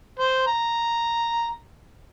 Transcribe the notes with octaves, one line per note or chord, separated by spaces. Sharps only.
C5
A#5